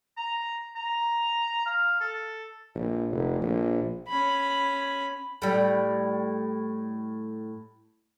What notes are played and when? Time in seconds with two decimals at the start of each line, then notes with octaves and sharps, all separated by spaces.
0.17 A#5
0.76 A#5
1.65 F5
2.01 A4
2.75 A#1
3.11 F1
3.41 A#1
4.08 C#4 B5
5.42 A2 G3